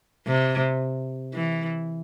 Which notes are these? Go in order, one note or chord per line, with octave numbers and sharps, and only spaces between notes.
C3
E3